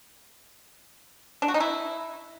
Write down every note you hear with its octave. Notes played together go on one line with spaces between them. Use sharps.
D4
F#4
D#4
E4